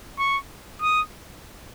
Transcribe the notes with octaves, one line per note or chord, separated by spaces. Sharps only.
C#6
D#6